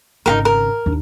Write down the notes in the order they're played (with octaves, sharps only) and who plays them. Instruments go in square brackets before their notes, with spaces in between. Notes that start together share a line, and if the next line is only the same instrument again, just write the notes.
[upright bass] G#1 C#3 [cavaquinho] D#4 G4 A#4
[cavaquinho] A#4
[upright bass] D#2 D4